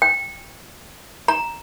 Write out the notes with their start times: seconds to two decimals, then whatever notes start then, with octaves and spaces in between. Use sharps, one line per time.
0.02 G5
1.28 A#5